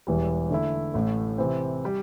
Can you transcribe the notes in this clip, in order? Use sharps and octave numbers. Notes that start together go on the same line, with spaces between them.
E1 E2 E3 G3
D3 A3 E4
A1 A2 A3
C3 E3 C4
G3